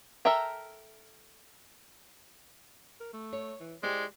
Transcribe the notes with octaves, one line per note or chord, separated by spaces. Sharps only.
A4 A#4 E5 G5 A#5
A#4
A3
C#5
E3
G#3 E4 G4 C5 D5